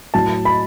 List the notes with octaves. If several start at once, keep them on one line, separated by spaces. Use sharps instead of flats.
A2 F#3 A5
B5